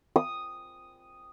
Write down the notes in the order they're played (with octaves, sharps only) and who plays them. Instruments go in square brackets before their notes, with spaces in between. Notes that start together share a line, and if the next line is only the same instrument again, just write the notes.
[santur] D#6